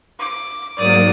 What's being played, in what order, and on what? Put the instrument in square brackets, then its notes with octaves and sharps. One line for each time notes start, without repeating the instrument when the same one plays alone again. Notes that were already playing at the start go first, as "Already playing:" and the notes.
[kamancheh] D6
[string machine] G#2 F#3 A#3 [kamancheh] D5 D#6